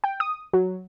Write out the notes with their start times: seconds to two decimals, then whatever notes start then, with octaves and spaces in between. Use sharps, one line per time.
0.04 G5
0.20 D#6
0.53 F#3